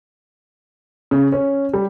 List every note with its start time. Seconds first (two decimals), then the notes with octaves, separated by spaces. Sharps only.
1.11 C#3
1.32 C#4
1.74 G3